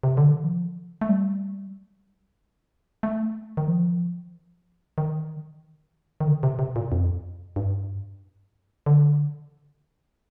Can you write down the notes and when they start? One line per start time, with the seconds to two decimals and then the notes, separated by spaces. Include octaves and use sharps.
0.03 C3
0.17 D3
0.30 D#3
0.44 F3
1.01 A3
1.09 G3
3.03 A3
3.57 D#3
3.67 F3
4.98 D#3
6.20 D#3
6.27 D3
6.43 C3
6.59 C3
6.76 A#2
6.92 F2
7.56 G2
8.86 D3